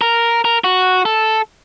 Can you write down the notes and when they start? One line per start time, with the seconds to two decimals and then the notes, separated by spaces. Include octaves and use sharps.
0.01 A#4
0.45 A#4
0.64 F#4
1.05 A4